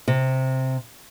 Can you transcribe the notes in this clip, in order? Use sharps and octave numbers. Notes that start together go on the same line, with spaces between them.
C3